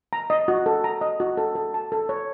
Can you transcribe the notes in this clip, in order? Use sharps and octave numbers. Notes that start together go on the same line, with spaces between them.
A#5
D#5
F#4
A4
A#5
D#5
F#4
A4
A4
A5
A4
C#5